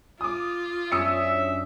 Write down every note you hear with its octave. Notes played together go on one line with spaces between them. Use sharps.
F4 D6 D#6
F#2 C#4 D4 E5 D#6 E6 C#7